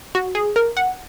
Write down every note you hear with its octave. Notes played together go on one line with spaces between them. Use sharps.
F#4
G#4
A#4
F#5